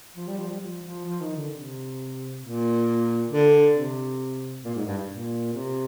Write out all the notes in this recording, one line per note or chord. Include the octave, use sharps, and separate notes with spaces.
F3
G3
F3
G3
F3
F3
F3
D#3
D3
C3
A#2
D3
C3
A#2
G#2
G2
A#2
C3